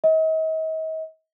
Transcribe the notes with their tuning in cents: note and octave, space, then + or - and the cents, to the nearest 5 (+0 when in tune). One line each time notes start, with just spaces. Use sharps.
D#5 +40